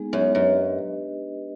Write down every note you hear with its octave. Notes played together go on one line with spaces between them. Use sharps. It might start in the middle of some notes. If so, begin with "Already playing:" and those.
Already playing: G#3 B3 D#4 G#4
F#2
F#2 D4 G4 B4 D#5